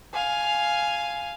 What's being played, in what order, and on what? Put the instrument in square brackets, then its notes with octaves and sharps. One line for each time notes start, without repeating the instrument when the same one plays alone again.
[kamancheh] F5 G#5